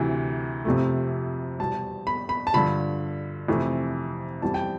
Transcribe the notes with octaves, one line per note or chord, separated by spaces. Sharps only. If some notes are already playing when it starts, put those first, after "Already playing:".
Already playing: D2 C3 E3
F2 C3 F3 A3
E2 B2 G3 A5
B5
B5
A5
G2 D3 F3 B5
F2 C3 E3 A3
F2 E3 G3 A5
G5